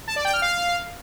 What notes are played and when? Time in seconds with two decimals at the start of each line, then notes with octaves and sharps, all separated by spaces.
0.07 A5
0.16 D5
0.25 G5
0.33 F6
0.42 F5